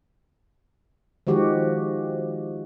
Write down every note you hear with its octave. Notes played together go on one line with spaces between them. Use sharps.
D#3 F3 G#3 F#4 G4